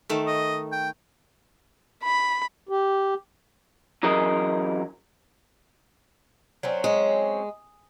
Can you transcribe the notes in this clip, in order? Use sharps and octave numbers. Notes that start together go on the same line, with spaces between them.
D#3 A3
D#5
G5
B5
G4
F#2 E3 F#3 G#4 A#4 D#5
F#3 C4 C#4
G#3